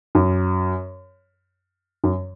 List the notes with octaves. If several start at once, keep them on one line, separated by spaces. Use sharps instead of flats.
F#2
F#2